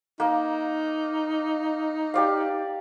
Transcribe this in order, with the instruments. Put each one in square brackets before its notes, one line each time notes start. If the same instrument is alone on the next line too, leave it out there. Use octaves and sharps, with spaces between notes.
[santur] A#3 [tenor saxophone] D#4
[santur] G4 D5 F5